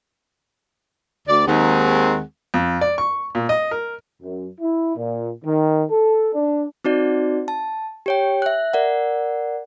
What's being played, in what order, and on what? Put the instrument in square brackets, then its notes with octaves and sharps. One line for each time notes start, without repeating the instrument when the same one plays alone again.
[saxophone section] D2 D5
D#2 D#3 G#3 C4 G#4 F#5
[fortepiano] F2
D5
C#6
A#2
D#5
A#4
[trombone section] F#2
E4
A#2
D#3
A4
D4
[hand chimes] C4 D#4 F#4 D5
A5
G4 C#5 G5
E5 F#6
A#4 D5 F#5